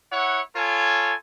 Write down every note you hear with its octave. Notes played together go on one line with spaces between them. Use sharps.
E4 C#5 F#5
F4 A4 C#5 G#5